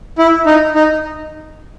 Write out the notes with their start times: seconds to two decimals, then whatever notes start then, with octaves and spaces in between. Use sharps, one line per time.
0.19 E4
0.46 D#4
0.75 D#4